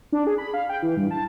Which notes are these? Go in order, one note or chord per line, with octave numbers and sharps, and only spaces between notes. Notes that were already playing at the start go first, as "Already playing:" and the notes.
D4
G#4
B5
F5
G5
E3
G2
A5